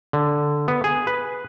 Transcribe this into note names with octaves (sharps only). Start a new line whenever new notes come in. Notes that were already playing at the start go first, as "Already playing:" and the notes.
D3
B3
G#4
B4